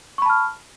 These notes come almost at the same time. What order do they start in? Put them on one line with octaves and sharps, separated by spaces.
C#6 B5 A5 F6